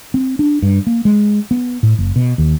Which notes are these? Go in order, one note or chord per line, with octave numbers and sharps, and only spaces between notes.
C4
D4
G2
A#3
G#3
B3
A2
F#1
B2
D#2